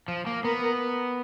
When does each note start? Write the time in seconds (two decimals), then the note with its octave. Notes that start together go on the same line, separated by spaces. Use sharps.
0.08 F3
0.27 A#3
0.44 B3 A#4